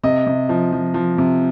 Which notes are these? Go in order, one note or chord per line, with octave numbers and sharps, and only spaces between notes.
C3 D#5
C3
F3
F3
F3
C3